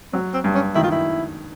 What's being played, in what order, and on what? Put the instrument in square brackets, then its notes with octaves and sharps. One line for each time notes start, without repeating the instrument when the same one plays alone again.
[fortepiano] F#3 [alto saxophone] C4
[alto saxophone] C4
[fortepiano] G2
[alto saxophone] C#4
[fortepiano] D#3 [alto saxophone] E4
[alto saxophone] F4
E4